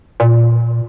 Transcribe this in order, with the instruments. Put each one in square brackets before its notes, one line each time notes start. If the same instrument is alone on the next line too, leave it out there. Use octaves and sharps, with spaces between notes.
[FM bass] A#2